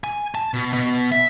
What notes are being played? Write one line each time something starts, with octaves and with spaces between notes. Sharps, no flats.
G#5
A5
B2
B2
E5